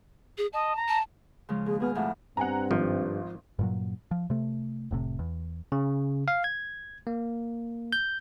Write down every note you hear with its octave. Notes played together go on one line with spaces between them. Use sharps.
G#4
D#5 A5
A#5
A5
C#3 F3 G#3
D#2 G#4
B2 B3 G#4 F6
F2 A2 F#5
G2 C4 F#5 G#5 A#5
G#1 F3
G2 A#2 F#3
F3
C3 A3
F1 A2 C3
E2
C#3
F5
G#6
A#3
G6